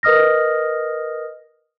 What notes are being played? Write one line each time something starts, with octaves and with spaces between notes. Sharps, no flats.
A#4 B4 D#5 D#6 F6 A#6